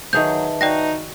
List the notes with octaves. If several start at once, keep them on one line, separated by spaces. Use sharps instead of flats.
D#3 F#3 G#4 B4 C#5 E5 A5 G6
D#4 F#4 D5 G5 A#6